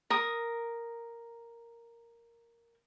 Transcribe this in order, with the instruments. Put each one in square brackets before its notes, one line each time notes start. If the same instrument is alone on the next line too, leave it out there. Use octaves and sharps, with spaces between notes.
[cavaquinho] A#4 D#6